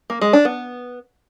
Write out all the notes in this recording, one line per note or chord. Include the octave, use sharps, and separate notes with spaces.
A#3
G#3
D4
B3